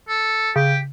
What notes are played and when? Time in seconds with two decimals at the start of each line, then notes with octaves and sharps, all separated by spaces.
0.09 A4
0.56 C#3 G4